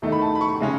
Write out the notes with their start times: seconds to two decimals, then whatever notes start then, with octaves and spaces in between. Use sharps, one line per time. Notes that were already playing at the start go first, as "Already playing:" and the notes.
0.02 E2 D#3 A3 D#4
0.12 B5
0.21 A5
0.35 B5
0.41 C#6
0.60 C#3 G#3 C#4